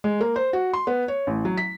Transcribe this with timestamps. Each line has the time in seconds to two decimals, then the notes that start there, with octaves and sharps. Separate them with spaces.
0.04 G#3
0.21 A#3
0.36 C5
0.53 F#4
0.73 C6
0.87 B3
1.08 C#5
1.27 A1
1.45 F#3
1.57 B6